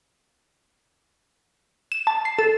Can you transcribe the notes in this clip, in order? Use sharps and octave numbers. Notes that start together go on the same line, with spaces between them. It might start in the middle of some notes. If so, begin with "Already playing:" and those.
E7
A5
C7
A4